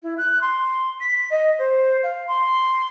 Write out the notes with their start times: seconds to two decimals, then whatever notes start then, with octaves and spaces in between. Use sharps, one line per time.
0.03 E4
0.18 F#6
0.41 C6
1.00 B6
1.30 D#5
1.58 C5
2.03 F5
2.27 C6